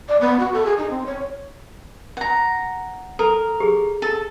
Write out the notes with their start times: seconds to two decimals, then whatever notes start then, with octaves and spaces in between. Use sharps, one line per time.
0.09 D5
0.21 B3
0.40 F#4
0.54 A4
0.66 G#4
0.78 D#4
0.90 C4
1.06 C#5
2.17 F#5 A#5
3.19 A4 A#4
3.60 G4 G#4
4.02 A4